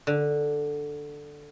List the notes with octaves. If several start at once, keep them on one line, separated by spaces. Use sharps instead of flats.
D3